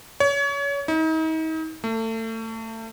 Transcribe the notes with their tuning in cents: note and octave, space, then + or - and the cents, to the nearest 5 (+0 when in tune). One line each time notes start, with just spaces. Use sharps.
C#5 +30
D#4 +40
A3 +30